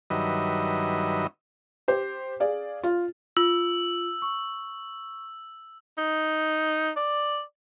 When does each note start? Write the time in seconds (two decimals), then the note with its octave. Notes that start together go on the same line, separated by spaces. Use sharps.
0.10 G2 D#3 F#3 B4 D#5 E5
1.88 G4 C5
2.40 G#4 D5 F5
2.83 F4
3.37 F4 E6
4.22 C#6
5.98 D#4
6.96 D5